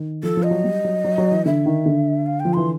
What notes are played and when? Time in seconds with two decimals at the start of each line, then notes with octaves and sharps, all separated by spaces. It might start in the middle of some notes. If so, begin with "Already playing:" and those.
Already playing: D#3
0.23 F3 A4
0.37 F3
0.43 D#5
0.51 F#3
0.64 G3
0.84 F#3
1.04 F#3
1.18 F#3
1.31 E3
1.46 D3 E5
1.66 D#3
1.86 D3
2.26 F5
2.40 G5
2.45 F3
2.54 E3 C6